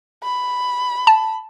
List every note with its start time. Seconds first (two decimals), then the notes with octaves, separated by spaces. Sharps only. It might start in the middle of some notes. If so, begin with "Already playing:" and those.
0.23 B5
1.07 A5